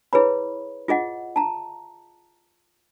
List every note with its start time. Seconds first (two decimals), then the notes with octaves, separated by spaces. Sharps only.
0.13 E4 G#4 B4 C#5 B5
0.88 F4 G#4 D#5 F#5
1.36 A5 A#5